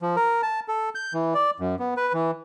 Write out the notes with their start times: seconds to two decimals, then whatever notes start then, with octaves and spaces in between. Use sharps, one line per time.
0.02 F3
0.16 A#4
0.43 A5
0.68 A4
0.95 G6
1.14 E3
1.35 D5
1.60 F#2
1.79 B3
1.97 B4
2.13 E3